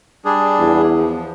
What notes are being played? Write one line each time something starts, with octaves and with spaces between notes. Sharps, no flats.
G3 D4 G#4
E2
F3